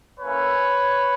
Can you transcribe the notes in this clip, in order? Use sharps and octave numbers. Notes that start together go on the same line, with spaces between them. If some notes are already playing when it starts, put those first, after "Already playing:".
A#3 C#4 E4 B4 C#5